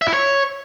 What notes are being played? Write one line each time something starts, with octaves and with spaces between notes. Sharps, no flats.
E5
E4
C#5